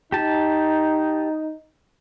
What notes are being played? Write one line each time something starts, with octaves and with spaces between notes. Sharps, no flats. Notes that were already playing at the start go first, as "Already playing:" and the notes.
D#4 G4 A5